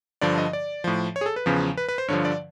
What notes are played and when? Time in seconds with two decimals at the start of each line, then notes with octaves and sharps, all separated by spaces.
0.21 G2 D3 F3 D5
0.38 D#5
0.53 D5
0.84 A2 F3
1.16 C#5
1.21 G#4
1.26 A4
1.36 B4
1.46 E2 C#3 F3
1.77 B4
1.89 B4
1.98 C5
2.08 G2 D3 F3 C#5
2.25 D5